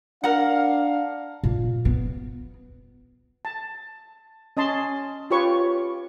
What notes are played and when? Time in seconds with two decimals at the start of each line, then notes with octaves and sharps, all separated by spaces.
0.24 D4 A#4 F5 F#5
1.43 A#2
1.85 B3
3.45 A5
4.57 C#4 D#5 A5 C6
5.31 F4 G4 B4 C#5 C#6